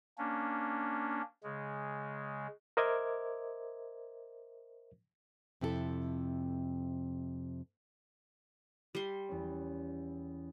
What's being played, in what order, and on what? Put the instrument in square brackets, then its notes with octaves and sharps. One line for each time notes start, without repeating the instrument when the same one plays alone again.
[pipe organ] A#3 C#4 D4
C#3 G#3
[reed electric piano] A#4 C5 D#5 E5 D6 G#6
[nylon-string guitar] F2 C3 E4 G4 A4
[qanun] G3 C6
[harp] E2 C#4